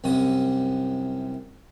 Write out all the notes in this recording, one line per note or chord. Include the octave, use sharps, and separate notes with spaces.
C2 F#2 C3 D#6